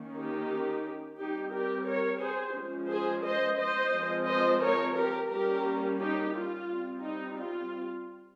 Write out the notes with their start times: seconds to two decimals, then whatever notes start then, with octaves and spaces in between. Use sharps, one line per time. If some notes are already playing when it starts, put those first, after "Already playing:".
Already playing: D#3 A#3 C#4
0.16 D#4 G4
1.19 G3 C4 D#4 G4
1.53 G4 A#4
1.87 A#4 C#5
2.22 G#4 C5
2.56 F3 G#3 C#4
2.90 G#4 C5
3.25 C5 D#5
3.60 C5 D#5
3.93 F3 G#3 C4
4.28 C5 D#5
4.63 A#4 C#5
4.97 G4 A#4
5.31 G3 A#3 C#4 G4 A#4
6.00 D#4 G4
6.34 F4
6.69 G3 C4
7.03 D#4
7.38 F4